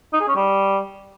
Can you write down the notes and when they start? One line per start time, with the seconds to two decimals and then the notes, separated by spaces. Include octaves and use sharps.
0.13 D#4
0.21 G#4
0.28 C#4
0.36 G3